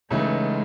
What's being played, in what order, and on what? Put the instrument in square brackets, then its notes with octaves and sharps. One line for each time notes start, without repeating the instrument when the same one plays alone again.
[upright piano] C#2 C#3 E3 A3 D#4 [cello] G#3